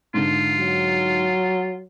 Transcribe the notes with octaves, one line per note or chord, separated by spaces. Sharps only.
G#2 D3 F4
F#3